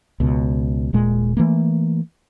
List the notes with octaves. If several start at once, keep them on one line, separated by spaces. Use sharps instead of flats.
C#2 B2
D#1 A#2 G#3
E3 A3 A#3